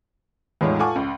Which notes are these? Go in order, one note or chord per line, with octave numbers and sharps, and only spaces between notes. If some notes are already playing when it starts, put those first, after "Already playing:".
E2 A2 G#3 D#4 F4 C#5
F4 A4 F#5 G#5 C#6 D6
C#2